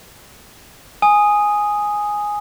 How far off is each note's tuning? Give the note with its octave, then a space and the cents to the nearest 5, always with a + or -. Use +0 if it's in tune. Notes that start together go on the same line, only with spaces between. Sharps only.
G#5 +0 D#6 +0